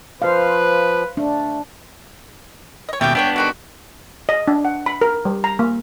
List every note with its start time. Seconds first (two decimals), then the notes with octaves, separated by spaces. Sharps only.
0.22 F3 B4 C5 F5
1.17 A3 D4
2.89 C#5 D#5
3.01 D#2 B2 A3 C#4 G4 G5
3.15 A3 B3 D4 B4 C#5 G5
3.36 D3 D#3 G#3 F#4
4.29 D#5
4.48 D4
4.65 F#5
4.86 B5
5.01 A#4
5.25 G3
5.44 A#5
5.59 A#3